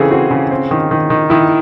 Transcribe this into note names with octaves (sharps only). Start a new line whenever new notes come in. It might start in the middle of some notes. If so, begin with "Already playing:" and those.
Already playing: C#3 E3 C4 G#4 A4
C4 F#4
C#3
C4
D#3
D#3
D#3
D#3 E4